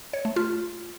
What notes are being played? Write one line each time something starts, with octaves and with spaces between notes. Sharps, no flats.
C#5
A3
F4